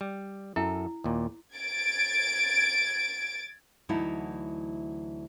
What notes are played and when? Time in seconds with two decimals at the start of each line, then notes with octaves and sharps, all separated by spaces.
0.01 G3
0.56 F#2 E4 A4
1.04 D#2 A#2
1.54 G#6 A6 D7
3.89 D2 E3 F#3 D#4 E4 F#5